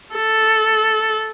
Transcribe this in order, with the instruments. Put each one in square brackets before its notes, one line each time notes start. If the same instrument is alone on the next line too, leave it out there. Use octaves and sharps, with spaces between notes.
[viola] A4